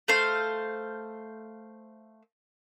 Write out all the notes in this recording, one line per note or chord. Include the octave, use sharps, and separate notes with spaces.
A3 C5 F5